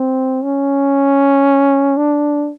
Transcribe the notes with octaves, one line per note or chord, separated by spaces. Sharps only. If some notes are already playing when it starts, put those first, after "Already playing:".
Already playing: C4
C#4
D4